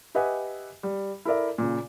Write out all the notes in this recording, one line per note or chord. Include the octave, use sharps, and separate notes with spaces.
G4 B4 D#5 E5 F#5 G#5
G3
E4 A4 A#4 D5 E5
A#2 C#3